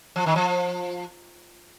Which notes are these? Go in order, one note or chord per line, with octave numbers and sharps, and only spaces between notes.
F3
D#3
F3